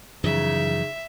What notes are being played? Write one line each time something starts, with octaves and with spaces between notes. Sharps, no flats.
F#2 C#3 E3 F3 D#4 E5